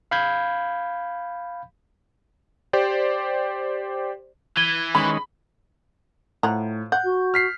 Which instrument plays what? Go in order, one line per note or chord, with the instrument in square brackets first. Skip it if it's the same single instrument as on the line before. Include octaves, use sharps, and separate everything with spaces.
[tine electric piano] F5 B5 G6 G#6
[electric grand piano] G4 C5 D5
[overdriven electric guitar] E3 [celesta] G#6 D#7 G7
[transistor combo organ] D#3 G#3 C#4 [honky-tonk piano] B5
[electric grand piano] A2 [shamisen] F3 F#5 A#5
[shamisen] F#5 [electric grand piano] G6
[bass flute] F#4
[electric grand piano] F6 B6 C7